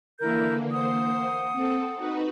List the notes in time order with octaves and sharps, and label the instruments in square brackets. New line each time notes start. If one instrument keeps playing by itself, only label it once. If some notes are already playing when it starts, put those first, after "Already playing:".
[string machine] D3 E3 A#3 [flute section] E4 A#4 G6
[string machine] A#3 C5 [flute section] F#5 D#6
[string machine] C4 A4
D#4 F#4 B4